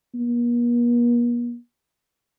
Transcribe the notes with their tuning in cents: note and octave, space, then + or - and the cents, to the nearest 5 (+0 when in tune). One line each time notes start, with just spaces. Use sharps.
A#3 +45